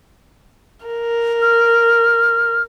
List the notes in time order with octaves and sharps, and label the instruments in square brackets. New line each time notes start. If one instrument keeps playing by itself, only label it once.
[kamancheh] A#4
[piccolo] F6